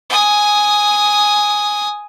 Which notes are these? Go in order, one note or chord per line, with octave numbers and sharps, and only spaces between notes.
G#5 D#6